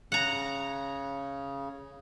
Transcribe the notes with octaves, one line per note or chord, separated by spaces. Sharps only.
C#3 F#5 A#5